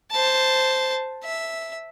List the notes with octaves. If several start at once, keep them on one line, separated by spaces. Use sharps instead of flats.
C5 A5
E5